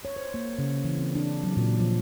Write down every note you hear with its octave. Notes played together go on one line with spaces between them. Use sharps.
C#5
C5
A#3
C#3
E3
C4
D4
F#3
A#2
F3